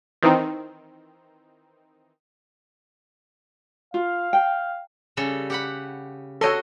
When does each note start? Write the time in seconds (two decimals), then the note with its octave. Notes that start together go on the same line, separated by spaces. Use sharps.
0.23 D#3 E3 C4 D#4
3.94 F4 F5
4.33 G5
5.17 C#3 G3 A4
5.50 G4 F#5 B5
6.41 F#4 A4 C#5 D#5 C6